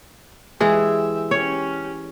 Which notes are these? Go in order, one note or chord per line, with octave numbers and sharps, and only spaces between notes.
E3 G#3 G4 G#4 E5
C#4 G4 C#5